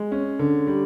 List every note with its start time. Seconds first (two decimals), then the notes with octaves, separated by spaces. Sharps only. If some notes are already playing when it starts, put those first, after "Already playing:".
Already playing: G#3
0.12 C#4
0.39 D3
0.67 G3